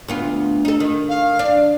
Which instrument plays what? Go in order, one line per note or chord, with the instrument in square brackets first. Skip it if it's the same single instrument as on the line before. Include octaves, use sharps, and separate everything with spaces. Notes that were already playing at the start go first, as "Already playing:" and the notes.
[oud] D2 B3 F4
D#4 A4
D#3
[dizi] F5
[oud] D4